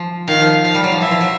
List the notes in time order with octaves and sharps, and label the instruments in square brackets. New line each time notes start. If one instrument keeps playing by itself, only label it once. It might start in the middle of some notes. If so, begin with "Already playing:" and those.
Already playing: [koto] F3
[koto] D#3 [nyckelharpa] F5
[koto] F3
[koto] F3 [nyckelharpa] F5
[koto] G3
F#3
F3
[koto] E3 [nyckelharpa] E5
[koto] F3
F#3